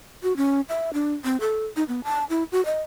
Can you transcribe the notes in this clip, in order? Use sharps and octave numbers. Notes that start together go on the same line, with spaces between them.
F#4
C#4
E5
D4
C4
A4
D#4
B3
A5
E4
F#4
D#5